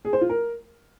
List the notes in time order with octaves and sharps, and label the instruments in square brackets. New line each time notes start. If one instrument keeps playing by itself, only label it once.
[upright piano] G#4
C5
F4
A#4